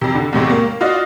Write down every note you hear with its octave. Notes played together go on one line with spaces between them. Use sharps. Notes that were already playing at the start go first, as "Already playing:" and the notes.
F2 C3
D3
E2 A2 C3 G#3
A#3
F4 F#4 D5 D#5 F5